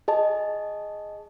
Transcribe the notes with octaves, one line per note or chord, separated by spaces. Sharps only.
G#4 D#5 A5